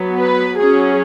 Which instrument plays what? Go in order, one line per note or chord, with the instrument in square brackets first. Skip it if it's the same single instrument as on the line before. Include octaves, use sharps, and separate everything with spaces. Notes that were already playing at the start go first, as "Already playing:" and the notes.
Already playing: [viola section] F#3 B3
B4
F#3 C#4 G#4